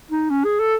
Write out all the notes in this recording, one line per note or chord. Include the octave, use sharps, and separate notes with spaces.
D#4
C#4
G#4
A4